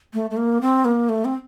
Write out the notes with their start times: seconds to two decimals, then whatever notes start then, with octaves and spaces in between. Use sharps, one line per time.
0.14 A3
0.30 A3
0.37 A#3
0.61 C4
0.85 A#3
1.09 A3
1.25 C4